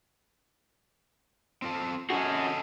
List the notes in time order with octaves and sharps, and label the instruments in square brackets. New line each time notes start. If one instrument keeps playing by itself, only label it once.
[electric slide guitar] C4 F4 A4
[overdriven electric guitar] C#4 F#4 [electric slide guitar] G#4 A4 D#5